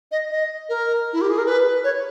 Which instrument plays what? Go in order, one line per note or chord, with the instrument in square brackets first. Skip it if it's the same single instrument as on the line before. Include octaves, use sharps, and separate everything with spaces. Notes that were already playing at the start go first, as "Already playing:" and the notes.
[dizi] D#5
D#5
A#4
E4
G4
G#4
A#4
B4
C#5